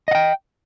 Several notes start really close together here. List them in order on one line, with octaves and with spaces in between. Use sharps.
D#5 F#5 G5